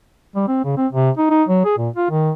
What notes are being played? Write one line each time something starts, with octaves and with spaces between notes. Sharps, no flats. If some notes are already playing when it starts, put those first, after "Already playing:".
G3
C4
C#3
C4
C3
D#4
D#4
F#3
G#4
A#2
F4
D#3